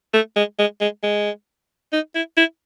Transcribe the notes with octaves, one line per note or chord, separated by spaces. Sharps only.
A3
G#3
G#3
G#3
G#3
D#4
E4
E4